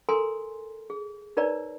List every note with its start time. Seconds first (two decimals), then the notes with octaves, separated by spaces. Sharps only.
0.09 A4 A#4 G#5 A#5 C6
0.90 G#4
1.37 D#4 A#4 B4 C#5 D5 A#5